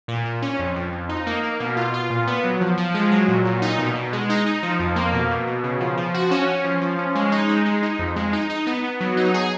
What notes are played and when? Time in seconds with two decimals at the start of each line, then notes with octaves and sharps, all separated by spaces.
0.08 A#2
0.25 A#2
0.42 C#4
0.59 F2
0.76 F2
0.93 F2
1.09 D#4
1.27 A#3
1.43 A#3
1.60 B2
1.77 F4
1.94 F4
2.10 A#2
2.27 B3
2.44 F#3
2.61 F3
2.78 F3
2.94 G#3
3.11 F#3
3.28 A#2
3.45 A#2
3.62 D#4
3.79 B2
3.95 B2
4.13 G#3
4.30 D#4
4.46 D#4
4.63 F3
4.79 F2
4.96 A#3
5.14 B2
5.31 B2
5.47 B2
5.64 C#3
5.80 F3
5.97 F3
6.14 F#4
6.31 C#4
6.48 C#4
6.64 F3
6.81 F3
6.99 C#4
7.15 G#3
7.32 D#4
7.49 G#3
7.66 G#3
7.83 D#4
7.99 F2
8.16 G#3
8.33 D#4
8.50 D#4
8.67 B3
8.84 B3
9.01 F#3
9.17 D#4
9.34 G#4